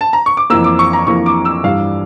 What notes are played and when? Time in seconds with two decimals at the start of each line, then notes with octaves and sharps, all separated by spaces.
0.01 A5
0.13 A#5
0.26 C#6
0.37 D6
0.50 F2 E3 A#3 E6
0.64 D6
0.79 C#6
0.93 A#5
1.07 F2 E3 A#3 C#6
1.26 D6
1.45 E6
1.64 G2 E3 G3 F5